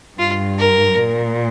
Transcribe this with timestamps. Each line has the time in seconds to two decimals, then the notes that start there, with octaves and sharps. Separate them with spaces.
0.18 G2 F4
0.59 A#4
1.00 A#2